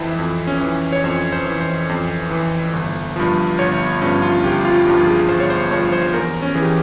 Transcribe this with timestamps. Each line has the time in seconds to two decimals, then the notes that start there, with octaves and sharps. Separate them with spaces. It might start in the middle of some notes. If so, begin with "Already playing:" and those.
Already playing: F2 E3 E4 C5
0.19 F2
0.47 C#4
0.61 E3
0.92 C#5
1.04 F2 C5
1.32 C5
1.46 E3
1.61 C5
1.89 F2
2.31 E3
2.73 G1
3.16 G2 F3
3.58 G1 C#5
4.01 G2 F3 C#4
4.22 F4
4.44 G1 G4
4.65 F4
4.72 G4
4.87 G2 F3
5.01 G#4
5.29 G1 C5
5.40 C#5
5.50 C5
5.71 G2 F3 C#5
5.93 C5
6.13 E2 A#4
6.42 C#4
6.54 E3 G#4
6.62 G4